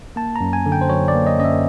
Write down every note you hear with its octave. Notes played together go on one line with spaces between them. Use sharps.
A#3 A5
F#2 A#5
G#5
D3
G5
C5
F#3 C#5
D5
A#3
D#5
F#2 D#5
E5